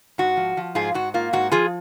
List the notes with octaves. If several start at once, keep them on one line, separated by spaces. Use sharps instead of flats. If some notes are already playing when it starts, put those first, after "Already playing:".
G#2 F#4
F3
F3
G#2 F4 G#4
G#2 F#4
A#3 F4
G#2 F#4
F3 F4 G#4